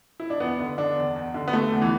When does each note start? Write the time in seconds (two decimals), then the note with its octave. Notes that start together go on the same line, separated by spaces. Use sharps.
0.20 E4
0.30 D4
0.40 E2 B3
0.60 D3
0.78 D3 D4
0.97 E2
1.16 E2
1.34 D3
1.48 B3
1.53 D3 A3
1.72 E2
1.82 E3